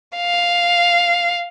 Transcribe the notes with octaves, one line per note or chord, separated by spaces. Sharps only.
F5